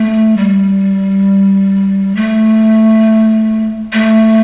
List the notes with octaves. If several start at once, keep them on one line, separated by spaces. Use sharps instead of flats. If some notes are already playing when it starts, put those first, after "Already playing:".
Already playing: A3
G3
A3
A3